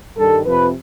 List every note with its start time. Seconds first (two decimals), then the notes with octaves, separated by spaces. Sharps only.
0.17 G2 D#3 G3 A4
0.46 F2 C3 F3 B4